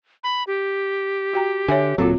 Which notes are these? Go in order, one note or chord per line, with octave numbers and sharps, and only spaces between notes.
B5
G4
F#4 G5 A#5
D3 C#5 E5 G#5
D1 A#2 F#3 C4 F4 A4